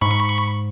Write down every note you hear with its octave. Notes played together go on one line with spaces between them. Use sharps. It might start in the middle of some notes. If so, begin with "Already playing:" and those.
G#2 B5 C#6